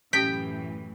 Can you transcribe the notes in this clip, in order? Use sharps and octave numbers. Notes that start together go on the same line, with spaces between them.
F#2 A2 E3 C#4 G4 G5 B6